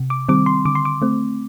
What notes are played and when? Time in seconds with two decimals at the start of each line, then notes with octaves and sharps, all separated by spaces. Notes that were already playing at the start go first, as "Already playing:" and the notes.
Already playing: C3
0.10 D6
0.29 D#3 G3 C4 D6
0.46 C6
0.65 D3 D6
0.75 C6
0.85 D6
1.02 A3 C4